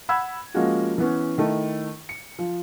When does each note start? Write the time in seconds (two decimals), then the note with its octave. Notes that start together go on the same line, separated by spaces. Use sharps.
0.09 F#5 B5 E6 G#6
0.54 F3 G#3 A#3 C#4 F#4
0.98 E3 B3 C#4
1.38 D#3 A3 E4
2.09 C#7
2.39 F3